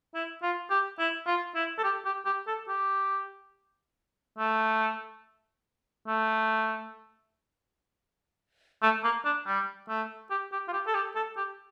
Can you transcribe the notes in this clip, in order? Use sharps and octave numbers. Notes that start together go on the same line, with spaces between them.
E4
F4
G4
E4
F4
E4
A4
G4
G4
G4
A4
G4
A3
A3
A3
A#3
D4
G3
A3
G4
G4
F4
G4
A4
G4
A4
G4